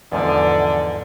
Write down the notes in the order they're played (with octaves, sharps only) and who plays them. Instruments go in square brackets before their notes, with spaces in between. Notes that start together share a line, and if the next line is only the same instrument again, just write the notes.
[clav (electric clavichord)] E2 G#2 F3 [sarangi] D3